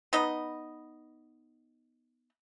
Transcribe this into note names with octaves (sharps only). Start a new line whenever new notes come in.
B3 D#4 B4 D#5